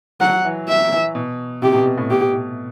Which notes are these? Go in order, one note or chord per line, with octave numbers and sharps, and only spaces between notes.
F#3 F#5
E3
E5
E3
B2
C3 G4
B2
B2
A2
B2 G4
B2